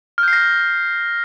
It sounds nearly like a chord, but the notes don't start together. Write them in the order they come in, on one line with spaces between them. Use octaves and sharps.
F6 G6 C7 A#6